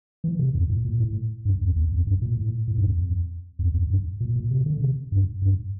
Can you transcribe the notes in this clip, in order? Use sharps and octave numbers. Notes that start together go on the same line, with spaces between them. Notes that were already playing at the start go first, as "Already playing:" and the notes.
E3
C3
F2
A2
A#2
A2
G2
F2
E2
F2
G2
A#2
A2
A2
G2
F2
F2
F2
G2
A#2
A#2
C3
D3
C3
G2
G2